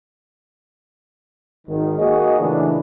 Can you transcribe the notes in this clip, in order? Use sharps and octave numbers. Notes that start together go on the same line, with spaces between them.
G#1 D#3
A#3 F#4 G#4 C#5 D#5
A#2 C#3 E3 A3 D4